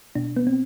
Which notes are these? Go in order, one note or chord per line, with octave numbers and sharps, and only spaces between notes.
B2 D4
B3
C4